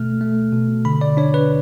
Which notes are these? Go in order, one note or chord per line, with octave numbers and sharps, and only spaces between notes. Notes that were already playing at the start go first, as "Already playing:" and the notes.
Already playing: B2 A3 F6
A3
B2
D3 B5
D5
D4 C#5
B4